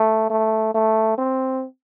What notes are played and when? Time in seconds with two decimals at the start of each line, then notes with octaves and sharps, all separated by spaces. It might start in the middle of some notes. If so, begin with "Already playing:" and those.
Already playing: A3
0.30 A3
0.74 A3
1.18 C4